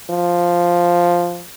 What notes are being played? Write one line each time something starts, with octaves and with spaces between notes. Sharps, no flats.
F3